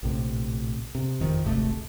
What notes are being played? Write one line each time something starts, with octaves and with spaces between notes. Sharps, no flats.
A#1 A2 C3
C3
G1 F2 D#3 F3
D1 G#1 C3 A3